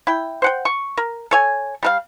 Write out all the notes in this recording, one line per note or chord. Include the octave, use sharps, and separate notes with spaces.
E4 G5
C5 F#5 G5
C#6
A#4
A4 C#5 G#5
G3 A#4 F5